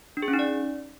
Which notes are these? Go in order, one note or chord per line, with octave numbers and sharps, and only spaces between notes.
D4
G#4
C#4
D#4
D5